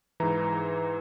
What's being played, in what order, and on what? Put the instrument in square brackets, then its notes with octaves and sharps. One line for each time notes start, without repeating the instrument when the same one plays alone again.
[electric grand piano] G#2 E3 A#5